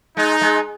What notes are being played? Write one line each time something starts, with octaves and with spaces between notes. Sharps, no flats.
G#3 D#4
G#3